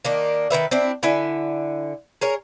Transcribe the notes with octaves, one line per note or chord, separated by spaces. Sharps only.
D#3 A#3 D4
D#3 G3 B4 E5
C4 D4 E4
D3 E4 E5 G#5
G#4 A#4 C#5